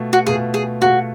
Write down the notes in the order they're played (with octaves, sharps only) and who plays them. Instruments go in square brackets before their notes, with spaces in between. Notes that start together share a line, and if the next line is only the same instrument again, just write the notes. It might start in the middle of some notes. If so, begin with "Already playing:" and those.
Already playing: [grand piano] B2 A3 F4
[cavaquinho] F#4
[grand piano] B2 A3 F4 [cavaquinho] G#4
[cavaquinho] G#4
[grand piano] B2 A3 F4 [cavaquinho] F#4